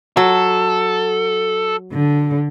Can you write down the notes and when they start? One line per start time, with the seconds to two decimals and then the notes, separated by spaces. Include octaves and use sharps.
0.17 F#3 A4
1.93 D3